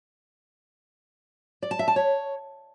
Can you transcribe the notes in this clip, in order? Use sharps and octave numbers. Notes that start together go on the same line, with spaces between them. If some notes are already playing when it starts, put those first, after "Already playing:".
D5
A5
E5
A5
C#5